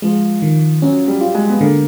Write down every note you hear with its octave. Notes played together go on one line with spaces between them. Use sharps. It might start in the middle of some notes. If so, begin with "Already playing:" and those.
F3 G#3
D#3
F#3 C#4
G3
F4
G#3
B3
D3 A#3